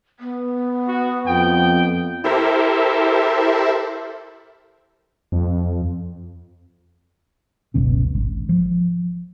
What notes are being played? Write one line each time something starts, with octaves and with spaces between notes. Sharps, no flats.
B3
F#4
F2 G5
E4 G4 A4 A#4 C5 E5
F2
F#1 C#2 B2 C#4
G#1
F3